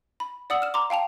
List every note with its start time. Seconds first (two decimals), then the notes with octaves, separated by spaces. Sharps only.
0.20 B5
0.50 D5 F#5 D#6 E6 F#7
0.62 F6 E7
0.74 A#5 C6 D6
0.90 F5 G5 A5 F7